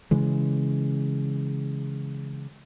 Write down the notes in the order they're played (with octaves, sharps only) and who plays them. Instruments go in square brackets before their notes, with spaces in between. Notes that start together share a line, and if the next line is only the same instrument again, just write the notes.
[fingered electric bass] C#3 E3 G#3